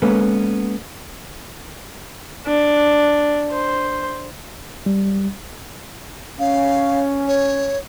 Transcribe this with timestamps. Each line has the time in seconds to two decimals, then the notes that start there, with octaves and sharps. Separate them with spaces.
0.02 G#3 A#3 B3 C#4 A4 B4
2.46 D4
3.52 C5
4.86 G3
6.39 C#4 F5
7.28 C#5